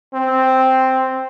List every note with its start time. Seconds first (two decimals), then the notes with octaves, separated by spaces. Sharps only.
0.14 C4